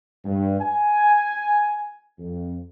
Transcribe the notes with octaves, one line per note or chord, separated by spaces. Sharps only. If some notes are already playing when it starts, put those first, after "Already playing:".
G2
G#5
F2